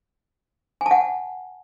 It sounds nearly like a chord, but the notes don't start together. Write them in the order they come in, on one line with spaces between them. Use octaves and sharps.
G#5 A5 F#5